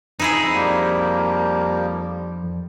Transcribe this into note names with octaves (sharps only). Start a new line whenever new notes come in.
F2 D#4 E4 G#4
F3 G3 A#3